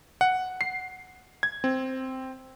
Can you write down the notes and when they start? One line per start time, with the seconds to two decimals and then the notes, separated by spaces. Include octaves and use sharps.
0.21 F#5
0.61 C7
1.43 G#6
1.64 C4